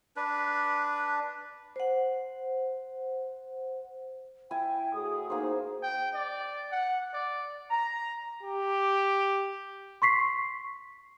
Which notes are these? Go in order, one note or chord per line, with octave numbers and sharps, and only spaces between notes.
D4 B4
C5 F#5
E4 G5 G#5
A2 F#4 G#4 D#6
A#3 D#4 C5
G5
D5
F#5
D5
A#5
G4
C6 C#6 B6 C7